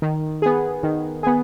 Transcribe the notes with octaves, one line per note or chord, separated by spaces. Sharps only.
D#3
B3 G#4
D#3
B3 G#4